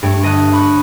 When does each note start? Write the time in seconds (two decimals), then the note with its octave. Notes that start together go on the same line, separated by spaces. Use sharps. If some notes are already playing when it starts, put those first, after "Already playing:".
0.03 G2 A3 C#5 D5
0.23 G1 D#5 A5 D#6 F#6
0.53 B5 C#6 F#6